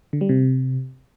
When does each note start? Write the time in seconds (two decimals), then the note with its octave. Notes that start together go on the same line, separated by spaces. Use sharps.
0.13 D3
0.21 G3
0.29 C3